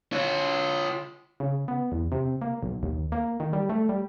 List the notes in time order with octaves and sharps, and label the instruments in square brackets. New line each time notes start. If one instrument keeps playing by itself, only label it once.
[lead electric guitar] F4 C#5
[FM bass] C#3
B3
E2
C3
A#3
B1
D#2
A#3
D#3
G3
A3
G3